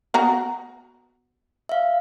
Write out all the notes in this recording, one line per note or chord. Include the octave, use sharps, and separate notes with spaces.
B3 F#4 A#5
E5 F5